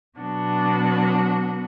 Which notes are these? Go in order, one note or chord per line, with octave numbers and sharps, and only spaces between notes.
B2 F#3 B3 D4 F#4